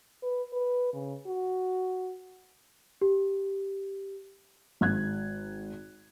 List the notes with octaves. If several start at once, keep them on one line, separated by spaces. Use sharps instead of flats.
B4
B4
C#3
F#4
G4
G#1 F#6 G#6